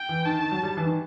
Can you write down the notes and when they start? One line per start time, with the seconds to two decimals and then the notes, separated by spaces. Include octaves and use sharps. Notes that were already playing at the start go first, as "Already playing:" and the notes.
Already playing: G5
0.09 E3
0.25 D#3 A5
0.39 D#3
0.52 F#3
0.63 G3
0.77 E3
0.85 D#3